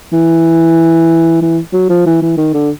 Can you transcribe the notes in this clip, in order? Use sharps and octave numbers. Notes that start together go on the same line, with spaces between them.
E3
E3
F#3
F3
E3
E3
D#3
D3